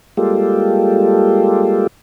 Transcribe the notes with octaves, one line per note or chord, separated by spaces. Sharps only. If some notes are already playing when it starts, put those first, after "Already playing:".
G3 G#3 A#3 F4 G4 A4